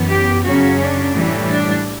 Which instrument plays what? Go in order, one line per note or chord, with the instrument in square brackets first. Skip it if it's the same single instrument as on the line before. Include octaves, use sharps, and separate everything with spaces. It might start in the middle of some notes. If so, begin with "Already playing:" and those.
Already playing: [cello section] F#2 E3 B3
G4
F#2 C#3 F#3 C#4 F#4
D4
A2 E3 G3
D4